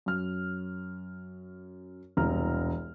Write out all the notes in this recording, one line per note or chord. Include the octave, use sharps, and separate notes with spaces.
F#2 F6
E1 C2 A#5 F6